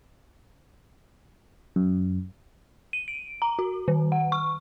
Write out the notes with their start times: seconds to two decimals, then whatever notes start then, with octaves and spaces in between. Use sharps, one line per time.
1.76 F#2
2.93 D#7
3.08 D7
3.42 A#5
3.59 F#4
3.88 D#3
4.12 F#5
4.32 C#6